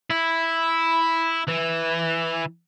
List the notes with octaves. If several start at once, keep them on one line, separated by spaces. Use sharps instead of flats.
E4
E3